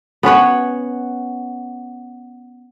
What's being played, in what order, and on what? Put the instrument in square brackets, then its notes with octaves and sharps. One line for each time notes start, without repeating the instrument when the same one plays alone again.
[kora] B3 C#4 B4 C#5